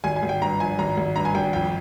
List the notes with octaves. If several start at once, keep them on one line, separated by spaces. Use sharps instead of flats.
G#1 G#5
G#5
G#1
G5
G2 A#5
F3 G#5
G#1 A#5
G#1
G2 A#5
G#5
G#1 G5
F2 G5